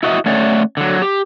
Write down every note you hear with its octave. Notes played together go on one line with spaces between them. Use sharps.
E4 F#4 D#5 E5
A3 C#4 C#5 D5 F#5
D3 F#3
G4